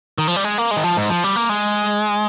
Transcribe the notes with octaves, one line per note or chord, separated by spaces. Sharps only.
D#3
F3
G3
G#3
A#3
G#3
D#3
F3
G#2
F3
G3
A#3
G#3